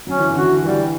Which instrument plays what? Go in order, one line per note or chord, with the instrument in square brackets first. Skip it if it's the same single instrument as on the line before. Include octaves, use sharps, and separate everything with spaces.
[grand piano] F#3 [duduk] C#4
[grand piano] E3
D3
[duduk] F#4
[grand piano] E3
[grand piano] E3 [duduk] G3